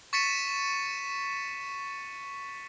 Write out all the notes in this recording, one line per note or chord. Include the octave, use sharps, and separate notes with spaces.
C#6 A6 B6 C#7 D#7 E7